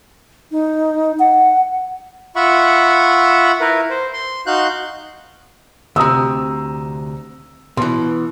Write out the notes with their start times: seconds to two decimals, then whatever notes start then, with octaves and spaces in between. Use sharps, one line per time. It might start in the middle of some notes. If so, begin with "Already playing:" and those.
0.51 D#4
1.19 F#5
2.36 F4 E5 F#5 B5 C#6
3.61 E4 A#4 B4
3.90 C5
4.13 C6
4.47 D#4 F#4 F5 C6 F#6 G6
5.96 D2 C3 A#5 D#6 E6
7.77 B2 E3 C6